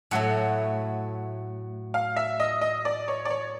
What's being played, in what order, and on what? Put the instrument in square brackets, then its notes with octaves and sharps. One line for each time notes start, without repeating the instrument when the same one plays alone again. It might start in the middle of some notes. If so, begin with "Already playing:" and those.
[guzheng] A2 F#3 A3 [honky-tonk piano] F#5
[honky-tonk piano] F5
E5
D#5
D#5
D5
C#5
D5
C#5